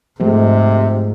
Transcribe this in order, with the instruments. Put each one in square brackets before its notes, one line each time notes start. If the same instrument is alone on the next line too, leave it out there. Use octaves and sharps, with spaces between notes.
[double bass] G#2 [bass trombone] C3 [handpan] F3 G#3 A3